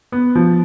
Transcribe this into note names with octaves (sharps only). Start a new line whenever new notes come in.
B3
F3